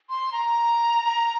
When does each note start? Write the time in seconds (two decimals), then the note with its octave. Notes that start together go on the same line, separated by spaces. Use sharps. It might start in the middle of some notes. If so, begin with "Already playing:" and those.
0.09 C6
0.32 A#5